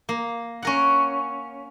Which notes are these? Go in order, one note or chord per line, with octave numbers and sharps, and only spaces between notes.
A#3
C#4 A#4 F#5